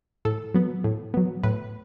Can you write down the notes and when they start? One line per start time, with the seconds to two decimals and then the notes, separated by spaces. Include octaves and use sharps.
0.25 A2 A4
0.54 F#3 B3
0.84 A2
1.14 F#3 B3
1.43 A2 B4